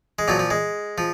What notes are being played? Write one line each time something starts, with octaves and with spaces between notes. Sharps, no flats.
G#3
A#2 F3 F#3
F3
G#3
F3